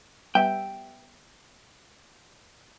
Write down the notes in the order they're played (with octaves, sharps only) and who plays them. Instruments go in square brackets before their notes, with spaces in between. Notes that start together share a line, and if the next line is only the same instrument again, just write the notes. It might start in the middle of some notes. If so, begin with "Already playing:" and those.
[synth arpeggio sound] G3 B3 E5 [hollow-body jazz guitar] G5